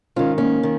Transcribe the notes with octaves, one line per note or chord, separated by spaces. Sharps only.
G#2 D#3 C#4 F4
A#3 C#4
D#3